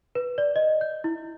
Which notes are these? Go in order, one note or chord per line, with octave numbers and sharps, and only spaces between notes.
B4
D5
D#5
G6
E4